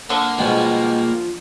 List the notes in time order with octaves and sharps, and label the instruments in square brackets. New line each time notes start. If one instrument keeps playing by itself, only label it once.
[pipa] D3 [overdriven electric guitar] A#3
[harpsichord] B2 G3 G#3 [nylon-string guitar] F3